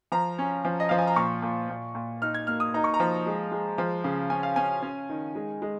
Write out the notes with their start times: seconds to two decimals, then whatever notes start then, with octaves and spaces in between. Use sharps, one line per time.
0.12 F3 A#5
0.38 C#4
0.65 F3
0.80 D#5
0.89 F3 F5
0.99 G#5
1.07 A#5
1.16 A#2 C#6
1.42 A#2
1.70 A#2
1.95 A#2
2.22 D#4 F6
2.35 G#6
2.47 A#3 F6
2.60 D#6
2.74 D#4 A#5
2.84 C#6
2.94 A#5
3.00 F3
3.26 G#3
3.52 G#3
3.78 F3
4.04 C#3
4.30 C#4 G#5
4.43 F5
4.56 C#4 G#5
4.82 C#4
5.09 D#3
5.35 G#3
5.62 G#3